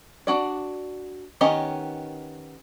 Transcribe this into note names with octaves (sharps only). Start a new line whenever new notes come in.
D4 F#4 D5
D#3 B3 C#4 G4 D#5